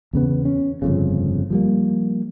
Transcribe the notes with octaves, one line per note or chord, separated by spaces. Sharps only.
E2 C#3 B3
C#4
G1 F2 C#3
F3 G3 A#3